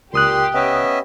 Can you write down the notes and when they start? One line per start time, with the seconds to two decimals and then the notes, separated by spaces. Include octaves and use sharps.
0.13 C#2 A#2 G4 C6 D#6 F#6
0.54 B3 C#4 D#5 E5